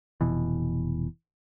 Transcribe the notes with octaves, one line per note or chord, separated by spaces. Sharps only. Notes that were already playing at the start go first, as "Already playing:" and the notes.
F1 B2 E3